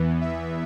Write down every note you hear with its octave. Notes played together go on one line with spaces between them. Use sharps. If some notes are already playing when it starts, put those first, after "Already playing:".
Already playing: E2 E3 B3
E5